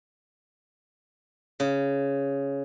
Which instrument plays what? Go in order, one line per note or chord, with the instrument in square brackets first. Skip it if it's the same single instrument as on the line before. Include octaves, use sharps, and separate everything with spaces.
[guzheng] C#3